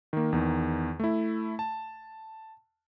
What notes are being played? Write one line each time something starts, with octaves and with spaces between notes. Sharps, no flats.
D#3 A#3
E2 D#3
A3 E4
A5